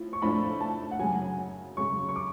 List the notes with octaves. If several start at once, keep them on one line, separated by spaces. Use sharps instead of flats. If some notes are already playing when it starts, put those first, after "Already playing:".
Already playing: A2 F3
C#6
A2 F3 A3 D4 B5
A5
F#5
F#2 C#3 F#3 G#5
F#2 C#3 F#3 C#6
C#6
D6